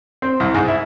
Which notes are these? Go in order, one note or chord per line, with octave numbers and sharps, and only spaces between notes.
C4
C2
G#2
E4